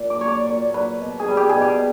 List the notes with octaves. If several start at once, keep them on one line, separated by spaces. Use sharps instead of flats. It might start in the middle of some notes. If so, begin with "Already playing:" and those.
Already playing: A#2
D5
F#3 C#5
D5
A#2 C#5
F#3 B4
B2
G#4
G3
G4
G#4
B2
G4